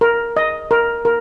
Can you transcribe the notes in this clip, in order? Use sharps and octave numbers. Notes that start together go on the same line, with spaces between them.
A#4
D#5
A#4
A#4